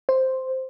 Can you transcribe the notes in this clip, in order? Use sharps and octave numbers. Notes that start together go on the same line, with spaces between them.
C5